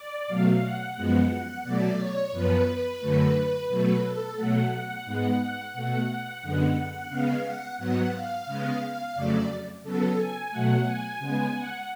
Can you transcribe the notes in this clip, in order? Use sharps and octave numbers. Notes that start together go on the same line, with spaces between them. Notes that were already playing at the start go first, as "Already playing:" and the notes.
Already playing: D5
B2 F#3 A3 F5
F#5
F#2 F3 G#3 B3
B2 F#3 A3 D5
C#5
F#2 F3 B3 B4
F#2 D3 F#3 A3
B2 F#3 A3 B4
A4
B2 F#3 A3 F#5
F#5
G#2 G#3 B3 F#5
F#5
B2 A3 F#5
F#2 D3 G#3 B3
C#3 G#3 B3 F5
F#5
G#2 F#3 B3 F#5
F5
C#3 G#3 B3
F2 C#3 F#3 A3 D5
C#3 F#3 B3 A4
G#5
B2 F#3 A3 F#5
G#5
C#3 G#3 B3 G#5
F#5